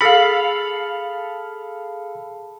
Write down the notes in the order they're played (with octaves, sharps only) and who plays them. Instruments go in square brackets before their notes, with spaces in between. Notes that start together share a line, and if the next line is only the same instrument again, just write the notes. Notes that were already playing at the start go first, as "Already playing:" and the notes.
[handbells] G#4 F6 [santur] A4 F5 [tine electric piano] B5